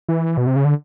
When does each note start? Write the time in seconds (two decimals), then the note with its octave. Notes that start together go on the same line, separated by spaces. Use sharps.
0.09 E3
0.37 B2
0.47 C3
0.56 C#3
0.65 D3